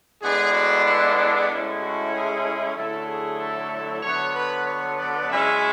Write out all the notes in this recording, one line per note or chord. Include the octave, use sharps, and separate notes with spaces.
A2 G#3 B3 D4 G#4
F#4
E4
E4
A2 G#3 C#4 E4
F#4
G#4
D3 F#3 A3 E4 A4
G#4
A4
D3 F#3 B3 C#5
B4
C#5
D5
F#2 C#3 G#3 C#4 E4 E5